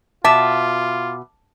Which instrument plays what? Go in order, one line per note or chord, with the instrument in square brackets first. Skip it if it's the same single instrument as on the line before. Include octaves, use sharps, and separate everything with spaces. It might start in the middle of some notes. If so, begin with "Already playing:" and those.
[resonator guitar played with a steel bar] B2 E5 [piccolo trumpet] F4 [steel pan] A5 [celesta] D6